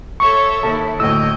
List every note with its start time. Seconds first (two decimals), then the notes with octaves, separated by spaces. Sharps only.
0.20 A4 C#5 E5 C#6
0.63 D#2 E4 A4
1.00 D2 A2 D#5 G5 E6